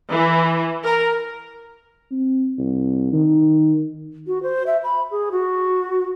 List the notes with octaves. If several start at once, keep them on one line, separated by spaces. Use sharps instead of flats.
E3
A#4
C4
C2
D#3
F#4
C5
E5
B5
G#4
F#4